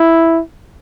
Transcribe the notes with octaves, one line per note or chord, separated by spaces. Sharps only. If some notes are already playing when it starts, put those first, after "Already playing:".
Already playing: E4